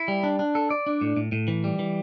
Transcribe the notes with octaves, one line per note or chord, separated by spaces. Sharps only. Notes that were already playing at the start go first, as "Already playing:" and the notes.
Already playing: E4
G3
D4
D4
A4
D5
D4
A2
A2
A2
E3
G3
E3